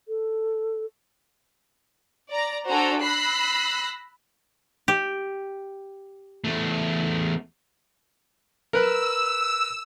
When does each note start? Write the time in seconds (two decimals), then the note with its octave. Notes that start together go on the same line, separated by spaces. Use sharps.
0.08 A4
2.32 D5 A#5 A#6
2.69 D4 F#4 A4 C5 G#5 A#5
3.01 B5 E6 F#6 A#6 C7
4.88 G4
6.44 E2 A3
8.73 A#4 B4 E6